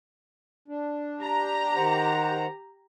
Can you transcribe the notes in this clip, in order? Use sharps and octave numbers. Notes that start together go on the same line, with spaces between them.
D4
G4 A#5
D#3 C5 F#5